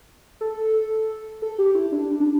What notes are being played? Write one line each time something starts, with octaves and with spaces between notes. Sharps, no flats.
A4
A4
G4
E4
D4
D4